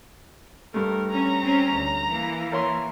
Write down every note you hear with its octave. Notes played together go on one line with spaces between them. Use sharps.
G2 A3 A#4
C#4 A#5
C4 C#4
D2
E3 A#3
A#4 C#5 C6